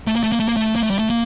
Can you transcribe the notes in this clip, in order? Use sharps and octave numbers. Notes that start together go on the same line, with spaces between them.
A3
A#3
A3
A#3
A3
A#3
A3
A#3
A3
G3
A3
A#3